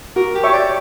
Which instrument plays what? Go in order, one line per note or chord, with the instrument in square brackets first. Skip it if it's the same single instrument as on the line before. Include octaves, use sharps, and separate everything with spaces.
[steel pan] F#4 [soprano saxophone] A#4
[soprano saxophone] G4
[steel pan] C#5 E5 G5 C#6
[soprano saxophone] D5